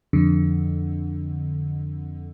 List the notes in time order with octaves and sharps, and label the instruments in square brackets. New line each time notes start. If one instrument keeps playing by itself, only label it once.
[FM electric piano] F2 D3